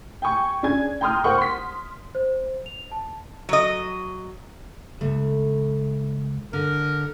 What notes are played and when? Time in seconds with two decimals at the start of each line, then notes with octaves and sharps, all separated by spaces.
0.22 G5 G#5 C#6
0.63 C#4 D4 G#4 G#5 G#6
1.01 G5 A#5 C6 D#6 F6
1.24 A#4 C5 F#5 G5 C#6
1.38 C6 B6
2.15 C5
2.66 F7
2.92 A5
3.49 F#3 D#5
5.01 C#2 A3
6.53 D3 A#4